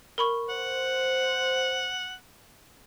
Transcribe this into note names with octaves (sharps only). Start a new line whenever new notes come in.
A#4 B5 C#6
C5 F#5